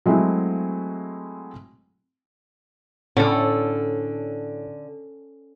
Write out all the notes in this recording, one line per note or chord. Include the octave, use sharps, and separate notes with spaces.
F#3 G#3 A3 C4 E4 F#4
A2 D3 C#4 A4